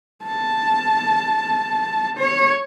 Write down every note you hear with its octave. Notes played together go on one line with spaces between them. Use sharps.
A5
C#5